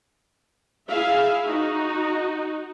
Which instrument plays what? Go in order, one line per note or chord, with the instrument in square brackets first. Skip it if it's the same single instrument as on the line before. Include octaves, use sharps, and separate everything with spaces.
[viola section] E4 G#4 E5 F5
D#4 F#4